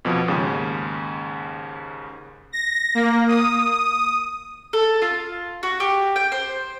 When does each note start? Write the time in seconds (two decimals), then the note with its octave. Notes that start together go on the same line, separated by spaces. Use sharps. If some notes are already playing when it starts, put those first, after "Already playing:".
0.05 F2 B2 F3
0.28 D#2 G#2 C#3
2.52 A#6
2.95 A#3
3.28 D#6
4.73 A4
5.02 F4
5.63 F#4
5.80 G4
6.16 G5
6.32 C5